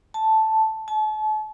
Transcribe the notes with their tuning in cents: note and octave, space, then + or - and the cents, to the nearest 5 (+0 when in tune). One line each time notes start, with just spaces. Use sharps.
A5 +0
A5 -40